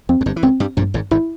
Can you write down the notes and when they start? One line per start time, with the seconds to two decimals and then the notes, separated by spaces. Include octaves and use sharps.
0.09 F2 C4
0.21 F2
0.26 G1 G2
0.36 E3
0.43 C#2 C#3 C4
0.60 G2 G3
0.77 A#1 G2 A#2
0.94 G#1 G#2
1.11 G#1 G#2 E4